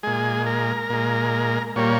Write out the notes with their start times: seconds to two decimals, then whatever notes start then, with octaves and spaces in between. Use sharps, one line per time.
0.03 A#2 G#3 G#4
0.46 A#4
0.89 A#2 G#3
1.76 A#2 G3 A#3 C#5